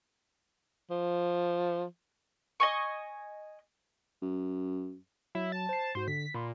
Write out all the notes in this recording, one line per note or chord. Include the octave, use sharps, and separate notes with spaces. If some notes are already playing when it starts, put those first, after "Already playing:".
F3
D#5 G#5 C#6
F#2
F#3 E4
A5
C5 C7
G#2 F#4 C5
D3 B6
A#2 B5 C6